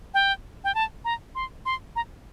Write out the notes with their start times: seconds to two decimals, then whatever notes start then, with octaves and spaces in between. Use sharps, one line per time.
0.14 G5
0.64 G5
0.75 A5
1.05 A#5
1.35 C6
1.66 C6
1.96 A#5